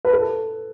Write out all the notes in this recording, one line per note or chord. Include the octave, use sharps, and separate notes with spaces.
B4
A4